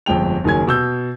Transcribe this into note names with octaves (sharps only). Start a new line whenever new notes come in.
G1 F2 G#3 G5 F7
F#1 D#3 F#3 G#5 G#6
B2 E6 G6